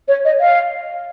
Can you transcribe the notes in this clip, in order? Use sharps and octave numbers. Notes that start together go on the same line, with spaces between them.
C#5
D#5
F5